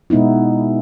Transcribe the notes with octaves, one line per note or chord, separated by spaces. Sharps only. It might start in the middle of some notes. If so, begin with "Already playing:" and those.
B2 G#3 B3 D#4 E4